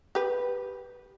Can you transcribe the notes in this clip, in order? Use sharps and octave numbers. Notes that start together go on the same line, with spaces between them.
G4 B4